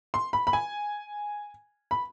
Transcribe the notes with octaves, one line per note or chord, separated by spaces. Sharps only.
C6
B5
B5
G#5
B5